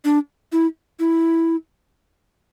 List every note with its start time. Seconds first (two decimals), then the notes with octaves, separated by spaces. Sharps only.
0.05 D4
0.52 E4
0.99 E4